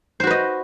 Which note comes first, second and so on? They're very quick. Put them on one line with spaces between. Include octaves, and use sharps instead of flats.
C5 F#4 B4 D#5